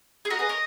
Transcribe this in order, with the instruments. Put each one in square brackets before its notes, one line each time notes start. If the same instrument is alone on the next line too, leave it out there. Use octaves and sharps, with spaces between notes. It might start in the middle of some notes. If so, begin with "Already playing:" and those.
[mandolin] G#4
[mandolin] F#4 A#4 [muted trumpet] D#5
[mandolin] G#4 B4
A#4 C#5